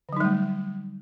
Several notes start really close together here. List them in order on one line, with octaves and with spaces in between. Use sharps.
D3 F#3 D#4 G3 A3